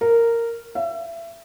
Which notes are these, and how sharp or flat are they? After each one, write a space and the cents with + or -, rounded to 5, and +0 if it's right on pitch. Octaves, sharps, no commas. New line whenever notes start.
A#4 -10
E5 +30